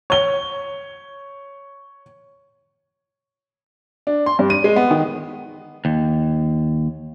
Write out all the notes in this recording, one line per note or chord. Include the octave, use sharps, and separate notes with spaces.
C#5 G7
D4
C6
G2
D#7
G#3
B3
D#3
D#2